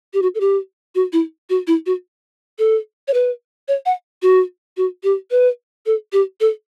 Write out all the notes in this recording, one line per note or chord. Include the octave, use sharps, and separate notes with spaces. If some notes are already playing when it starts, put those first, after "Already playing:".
G4
F#4
A4
G4
F#4
E4
F#4
E4
F#4
A4
C#5
B4
C#5
F#5
F#4
F#4
G4
B4
A4
G4
A4